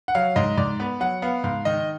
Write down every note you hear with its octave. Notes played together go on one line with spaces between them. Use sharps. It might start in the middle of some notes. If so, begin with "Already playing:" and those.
F#5
F#3 F5
G#2 D#5
G#2 D5
B3 B4
F#3 F#5
B3 F5
G#2 F5
D#3 D#5